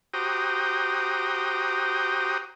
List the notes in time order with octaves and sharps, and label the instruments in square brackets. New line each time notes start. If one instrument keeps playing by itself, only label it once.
[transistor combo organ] F#4 G4 C5 G5 A#5 D#6